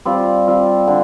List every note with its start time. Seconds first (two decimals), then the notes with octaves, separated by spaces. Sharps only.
0.05 G3 C4 F4
0.47 G3 C4 F4
0.88 D3